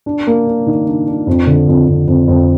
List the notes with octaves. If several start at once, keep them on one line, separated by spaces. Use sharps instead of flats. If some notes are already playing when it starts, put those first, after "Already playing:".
D4
A#3
D4
D#3
D4
D4
F2
D3
F2
F2
F2
F2